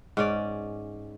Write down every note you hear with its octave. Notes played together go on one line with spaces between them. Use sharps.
G#2 C#4 D5